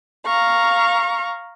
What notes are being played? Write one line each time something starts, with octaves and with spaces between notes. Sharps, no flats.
F5 A#5 C#6